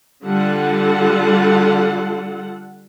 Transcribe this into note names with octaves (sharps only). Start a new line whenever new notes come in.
D3 G3 F4 A4 F#5